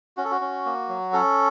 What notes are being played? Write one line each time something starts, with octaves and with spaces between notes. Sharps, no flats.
C#4 F#4
A4
F#4
C#4
A#3
F#3
C#4 A4